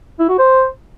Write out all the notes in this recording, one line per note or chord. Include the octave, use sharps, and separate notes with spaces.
E4
F#4
C5